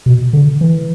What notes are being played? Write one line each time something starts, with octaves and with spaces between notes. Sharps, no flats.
B2
D3
E3